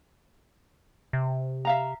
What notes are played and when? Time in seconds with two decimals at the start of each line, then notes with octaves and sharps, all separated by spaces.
1.13 C3
1.65 E5 F5 A#5